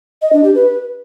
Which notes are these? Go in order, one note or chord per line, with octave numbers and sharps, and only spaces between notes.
D#5
D4
G4
B4